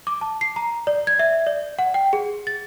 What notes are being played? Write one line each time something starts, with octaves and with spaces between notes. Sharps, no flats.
D6
A5
C7
A#5
D5
G#6
E5
D5
F#5
G5
G#4
A6